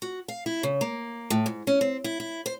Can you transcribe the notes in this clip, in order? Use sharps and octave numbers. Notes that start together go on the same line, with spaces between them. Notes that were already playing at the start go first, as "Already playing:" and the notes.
F#4
F5
E4
C#3
A#3
A2
G#2
C#4
C4
E4
E4
C5